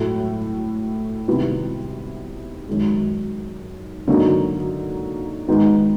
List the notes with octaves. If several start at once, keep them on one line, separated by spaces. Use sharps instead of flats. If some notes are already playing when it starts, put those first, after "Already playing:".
Already playing: A2 F#3 A3
C3 D#3 G3 B3 E4
F#2 D#3 G#3
D3 F#3 A#3 D#4
G#2 D#3 G#3 B3 D#4